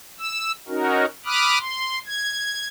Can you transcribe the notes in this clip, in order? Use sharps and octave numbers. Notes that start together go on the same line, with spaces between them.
E6
C#4 D#4 F#4 A#4
B5 D6 D#6 F6 F#6
C6
G#6